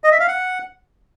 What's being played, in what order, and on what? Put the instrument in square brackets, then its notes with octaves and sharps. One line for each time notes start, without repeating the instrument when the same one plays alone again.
[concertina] D#5
E5
F5
F#5